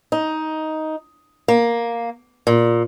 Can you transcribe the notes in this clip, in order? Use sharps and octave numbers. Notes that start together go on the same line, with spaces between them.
D#4
A#3
A#2